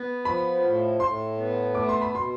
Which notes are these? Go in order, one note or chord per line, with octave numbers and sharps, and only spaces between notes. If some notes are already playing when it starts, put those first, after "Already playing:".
Already playing: B3
F3 B5
A2
A2 C6
B3
A3 D6
C6
B5
B2 C6